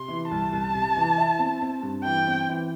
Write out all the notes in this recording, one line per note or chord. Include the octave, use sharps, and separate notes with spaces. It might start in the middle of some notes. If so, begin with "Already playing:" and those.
Already playing: C3 C6
E3
C2 A5
C2
C3
E3
E4
C4
C4
G2
E3 G5
C4
E3